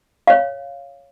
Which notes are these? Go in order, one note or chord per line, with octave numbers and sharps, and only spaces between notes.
C#5 F5